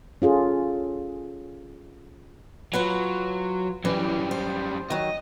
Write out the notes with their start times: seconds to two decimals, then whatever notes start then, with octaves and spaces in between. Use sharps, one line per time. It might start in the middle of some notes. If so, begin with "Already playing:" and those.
0.22 C#4 F4 G#4 A4
2.73 F#3 F4 B4 F#5
3.85 F#2 E3 G3
4.31 C5
4.90 D#3 F#3 D#5